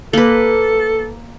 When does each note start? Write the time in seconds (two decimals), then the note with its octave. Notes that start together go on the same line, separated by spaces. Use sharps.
0.13 A#3 A4 B4